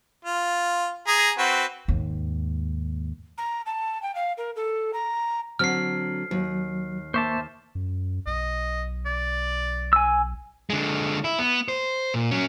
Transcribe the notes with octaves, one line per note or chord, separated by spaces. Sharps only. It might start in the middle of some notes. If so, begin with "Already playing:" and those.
F4
G#4 A#5
C4 F#4 B4
D#2 G#2
A#5
A5
G5
F5
A#4
A4
A#5
D3 F#3 C4 F6 C7
D#2 F#3
A#3 C5 E5 A5 C#6 D6
F#2
B1 D#5
D5
G#5 E6
D3 G#3
E4
B3
C5
A#2
F#3 C#4